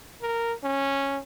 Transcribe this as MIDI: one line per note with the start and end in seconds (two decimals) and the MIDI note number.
0.22 0.53 70
0.64 1.19 61